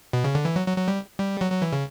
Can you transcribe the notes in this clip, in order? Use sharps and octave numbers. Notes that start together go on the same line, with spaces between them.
B2
C#3
D3
E3
F#3
F#3
F#3
G3
G3
F#3
F#3
E3
C#3